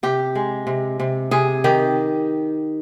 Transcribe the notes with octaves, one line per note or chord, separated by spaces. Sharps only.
C3 G4
G#3
C3
C3
C3 G#4
D#3 G4